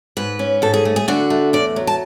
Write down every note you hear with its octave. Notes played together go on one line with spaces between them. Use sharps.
G#2 B4
C#4
G#2 A4
G#4
A3
G#4
D3 F#4
A3
E2 D5
F#3
A5